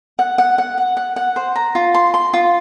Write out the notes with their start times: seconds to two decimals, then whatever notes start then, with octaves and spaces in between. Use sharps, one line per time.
0.19 F#5
0.38 F#5
0.58 F#5
0.78 F#5
0.97 F#5
1.16 F#5
1.36 C5
1.56 A#5
1.75 F4
1.94 C6
2.14 C6
2.33 F4